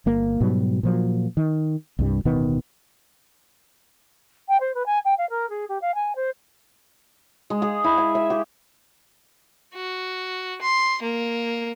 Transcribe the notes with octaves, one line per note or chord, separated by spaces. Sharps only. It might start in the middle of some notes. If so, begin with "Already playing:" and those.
G1 A#3
G#2 B2 F#3 G3
A#2 F3 F#3
D#3
C2 G2 G3
D1 B2 D#3 B3
G5
C5
B4
G#5
G5
F5
A#4
G#4
G4
F5
G#5
C5
G#3
G#4
E4
G#5
E5
G4
F#4
C6
A#3